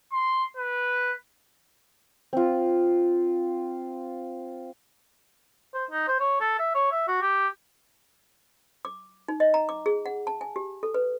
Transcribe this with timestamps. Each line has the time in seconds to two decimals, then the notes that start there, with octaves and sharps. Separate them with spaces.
0.12 C6
0.56 B4
2.33 C4 F4
5.74 C5
5.91 D#4
6.08 C5
6.20 C#5
6.41 A4
6.59 E5
6.75 C#5
6.92 E5
7.08 F#4
7.22 G4
8.85 D6
9.28 D#4
9.40 D#5
9.54 A#5
9.69 D6
9.86 G#4
10.06 F#5
10.27 A5
10.41 G#5
10.56 G4
10.83 A4
10.94 B4